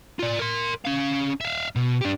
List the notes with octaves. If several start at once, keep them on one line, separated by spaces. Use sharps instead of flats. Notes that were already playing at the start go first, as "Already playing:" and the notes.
F4 D5
A#4 C6
C#4 F5
E5 F5
B2
D4 G4